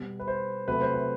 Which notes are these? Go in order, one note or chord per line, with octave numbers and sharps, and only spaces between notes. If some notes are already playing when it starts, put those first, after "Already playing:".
Already playing: B2 G3 B3
B4
C5
C3 F#3 A3 B4
C5
B4